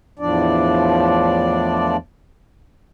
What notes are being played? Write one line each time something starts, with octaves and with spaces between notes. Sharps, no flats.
E2 A2 F3 D4 D5